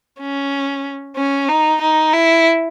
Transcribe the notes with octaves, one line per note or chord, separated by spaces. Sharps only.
C#4
C#4
D#4
D#4
E4